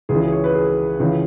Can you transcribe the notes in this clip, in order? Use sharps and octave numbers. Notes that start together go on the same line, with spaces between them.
C#2 C#3 E3 G#4
G#4
C#5
B4
G#4
C#2 C#3 E3